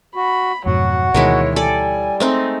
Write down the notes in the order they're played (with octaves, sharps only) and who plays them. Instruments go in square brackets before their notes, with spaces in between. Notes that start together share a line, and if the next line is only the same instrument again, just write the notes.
[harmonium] F#4 [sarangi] B5
[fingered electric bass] F2 G#2 B2 [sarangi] F#3 [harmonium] F#4 F#5
[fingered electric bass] D2 B2 E3 [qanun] D#3 G#3 E4 [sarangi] C#5
[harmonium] G3 [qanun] A4 D5 [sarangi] G#5
[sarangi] G#3 [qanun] A3 C4 D#4